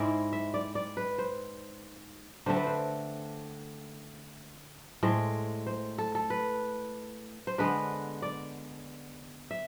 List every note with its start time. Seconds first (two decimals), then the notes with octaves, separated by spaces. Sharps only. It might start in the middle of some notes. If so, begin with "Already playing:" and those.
Already playing: G#2 G#3 C4 E4 C5 D5
0.33 E5
0.54 D5
0.75 D5
0.97 B4
1.18 C5
2.46 D3 A3 C4 C5
2.56 B4
2.67 C5
5.03 A2 G#3 C4
5.67 C5
5.98 A4
6.15 A4
6.30 B4
7.47 C5
7.58 D3 G#3 B3 B4
8.22 D5
9.51 E5